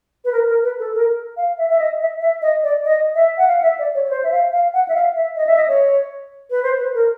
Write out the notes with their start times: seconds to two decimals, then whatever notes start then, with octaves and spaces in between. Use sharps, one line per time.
0.25 B4
0.32 A#4
0.47 A#4
0.63 B4
0.79 A4
0.95 A#4
1.37 F5
1.58 E5
1.68 E5
1.79 D#5
2.00 E5
2.21 E5
2.42 D#5
2.63 D5
2.85 D#5
3.15 E5
3.38 F#5
3.48 F5
3.62 E5
3.79 D5
3.95 C#5
4.05 C#5
4.11 C5
4.24 E5
4.31 F5
4.52 F5
4.74 F#5
4.88 E5
4.94 F5
5.16 E5
5.36 D#5
5.47 E5
5.57 D#5
5.68 C#5
6.50 B4
6.63 C5
6.78 B4
6.94 A#4